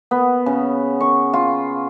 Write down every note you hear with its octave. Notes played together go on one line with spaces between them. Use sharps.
B3
C#3
C#6
F4